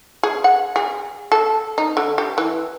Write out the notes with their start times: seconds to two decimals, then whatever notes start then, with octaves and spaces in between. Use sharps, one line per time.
0.23 G#4
0.44 F#5
0.76 G#4
1.32 A4
1.78 D#4
1.97 D3
2.18 G4
2.38 E3